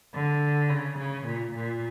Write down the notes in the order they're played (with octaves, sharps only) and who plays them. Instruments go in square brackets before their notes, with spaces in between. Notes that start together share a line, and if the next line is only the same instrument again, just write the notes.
[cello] D3
C#3
C#3
A#2
A#2